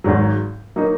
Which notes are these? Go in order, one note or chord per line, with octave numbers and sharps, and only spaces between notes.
G#1 G#2 F#3
F#3 A#3 D#4